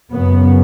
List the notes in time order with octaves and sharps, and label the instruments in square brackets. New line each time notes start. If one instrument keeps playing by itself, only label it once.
[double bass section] F#2 C#3 B3